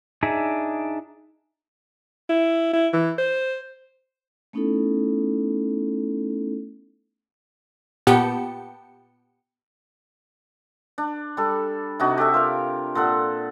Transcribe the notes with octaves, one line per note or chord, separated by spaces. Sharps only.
D4 D#4 G#4 E5
E4
E4
E3
C5
A3 B3 C#4 D#4 E4 A4
A#2 B3 G4 G5 A5 C#7
D4
G3 A4
C3 D4 D#4 F#4
G4 A4 E5
F4 A#4 F5
A#2 A4 F#5